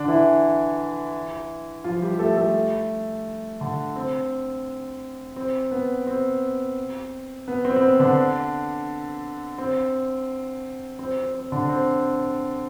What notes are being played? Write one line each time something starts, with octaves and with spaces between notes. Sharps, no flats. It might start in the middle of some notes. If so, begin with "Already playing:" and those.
Already playing: D3 D4
E3 E4
F3 F4
G3 G4
A3 A4
A3 A4
D3 D4
C4
C4
B3
C4
B3
C4
C4
B3
D3 D4
C4
C4
C4
C4
D3 D4
C4